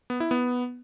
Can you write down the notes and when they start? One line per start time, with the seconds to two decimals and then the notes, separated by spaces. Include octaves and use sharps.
0.10 B3
0.20 E4
0.31 B3